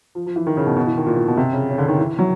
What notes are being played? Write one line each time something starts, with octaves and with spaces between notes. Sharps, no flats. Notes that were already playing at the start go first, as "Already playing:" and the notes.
F3
F3
E3
D#3
C#3
B2
B2
E3
D#3
A#2
A#2
B2
C3
C#3
C#3
D3
D#3
E3
F#3